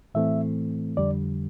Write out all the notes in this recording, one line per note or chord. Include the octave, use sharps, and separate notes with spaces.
A2 E3 A3 C4 E5
F2 D3 G3 D5